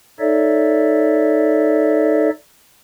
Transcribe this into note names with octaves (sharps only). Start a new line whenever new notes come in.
D#4 A4 C#5 D5 E5